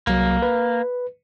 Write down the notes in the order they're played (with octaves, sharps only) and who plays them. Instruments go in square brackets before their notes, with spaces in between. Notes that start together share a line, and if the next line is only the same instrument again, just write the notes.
[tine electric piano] C2 F#3 [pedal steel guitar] A#3
[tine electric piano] B4